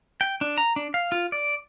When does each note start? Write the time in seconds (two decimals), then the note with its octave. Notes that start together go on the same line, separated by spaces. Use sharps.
0.21 G5
0.41 D4
0.58 A#5
0.76 D4
0.94 F5
1.12 F4
1.32 D5